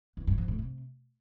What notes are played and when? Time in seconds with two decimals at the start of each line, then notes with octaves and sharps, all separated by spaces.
0.17 E2
0.27 G2
0.38 F3
0.48 A2
0.59 C3